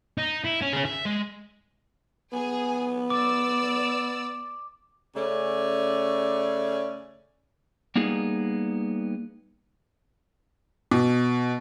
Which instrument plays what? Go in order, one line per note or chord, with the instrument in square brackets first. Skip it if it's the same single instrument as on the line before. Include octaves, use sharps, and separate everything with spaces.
[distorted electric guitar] D#4
E4
C#4
C#4 G#4
E5
G#3
[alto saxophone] B3 [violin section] G#4 G#5
[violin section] D5 E6 [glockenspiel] D6
[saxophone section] C#3 A3 C#4 D5
[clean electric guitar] G3 A#3 B3 D#4 G#4
[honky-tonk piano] B2